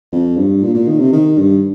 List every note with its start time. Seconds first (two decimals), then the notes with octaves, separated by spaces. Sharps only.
0.12 F2
0.37 G2
0.63 A#2
0.74 A#2
0.87 D#3
0.99 C3
1.12 D#3
1.38 G2